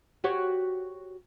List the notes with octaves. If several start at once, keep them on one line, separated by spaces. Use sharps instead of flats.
F#4 G4 C#5